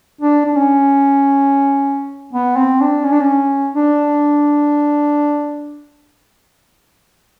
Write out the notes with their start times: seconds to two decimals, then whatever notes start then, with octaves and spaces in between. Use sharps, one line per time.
0.21 D4
0.46 D4
0.56 C#4
2.33 B3
2.57 C4
2.81 D4
3.04 C#4
3.12 D4
3.21 C#4
3.75 D4